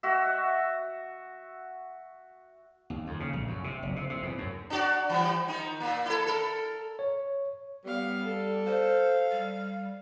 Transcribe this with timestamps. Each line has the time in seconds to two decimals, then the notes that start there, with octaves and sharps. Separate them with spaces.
0.03 F#4 E5
2.90 D#2
3.07 F2
3.20 C#3
3.33 A#1
3.48 F#2
3.64 C3
3.83 F#1
3.96 C3
4.10 C3
4.23 E2
4.38 F#2
4.70 D4 F#4 D5
5.09 E3 G3
5.48 D#3 D#4
5.80 A#2 A#3
6.05 E4 A4
6.26 A4 A#4
6.99 C#5
7.84 G3 B3 F5
8.25 A4
8.66 C5 F5
9.31 G3